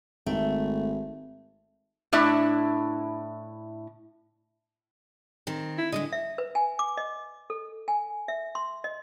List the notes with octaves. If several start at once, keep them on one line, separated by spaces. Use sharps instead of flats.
G#1 A3
A2 D4 E4 E5
D#3 C4
E4
D3 G3 G#3 D#5
E5
B4
G#5
D6
D#5
A4
G#5
E5
C6
D#5